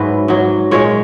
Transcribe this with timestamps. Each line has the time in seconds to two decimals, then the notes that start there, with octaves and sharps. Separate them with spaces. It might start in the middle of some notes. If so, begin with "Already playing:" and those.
Already playing: G#2 F#3 E4 B4
0.28 G#2 F#3
0.71 A#2 G#3 C#5